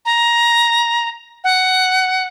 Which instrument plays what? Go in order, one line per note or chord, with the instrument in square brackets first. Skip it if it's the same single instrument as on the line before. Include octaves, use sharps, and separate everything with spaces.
[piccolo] A#5
F#5